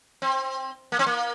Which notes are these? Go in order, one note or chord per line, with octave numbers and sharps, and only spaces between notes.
C4
A#3
C4
A#3